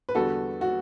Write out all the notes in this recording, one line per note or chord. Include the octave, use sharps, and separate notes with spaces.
B4
E2 D3 G3 B3 F#4 A4
F#4